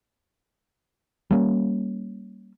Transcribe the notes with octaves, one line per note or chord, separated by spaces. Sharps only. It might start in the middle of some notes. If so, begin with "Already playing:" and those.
G3 A#3 C#4